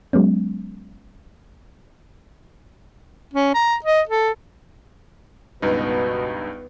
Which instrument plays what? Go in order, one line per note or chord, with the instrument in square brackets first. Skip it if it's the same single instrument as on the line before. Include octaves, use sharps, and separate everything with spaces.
[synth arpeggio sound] F#3 G#3 B3 C#4
[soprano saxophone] C#4
A#5
D#5
A4
[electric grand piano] C#2 G2 D#4 [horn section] B2 [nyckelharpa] B3